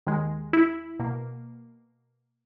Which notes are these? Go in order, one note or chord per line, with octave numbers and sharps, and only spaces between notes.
D#2 D#3 G#3
E4
B2 A#3